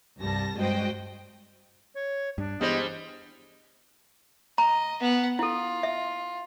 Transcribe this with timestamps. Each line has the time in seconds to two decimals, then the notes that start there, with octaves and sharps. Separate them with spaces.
0.21 C2 G2 G3 A5 A#6
0.58 G2 G#3 F#4 C5 D#5 G5
1.95 C#5
2.38 G2 D4
2.61 E3 G3 G#3 B3 C5 D#5
4.58 D#5 A#5
5.01 B3 F#5
5.39 E4 F4 A4
5.83 E5